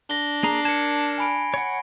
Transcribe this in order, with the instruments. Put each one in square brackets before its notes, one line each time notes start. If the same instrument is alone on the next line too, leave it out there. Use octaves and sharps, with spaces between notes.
[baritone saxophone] D4 [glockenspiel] A#6 G7
[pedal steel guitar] A#3 G#4 A#5 [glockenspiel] C7
[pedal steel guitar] A#4 A5 [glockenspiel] G#6 C#7
[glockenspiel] G#5 B5 D7
[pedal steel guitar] C#5 F#5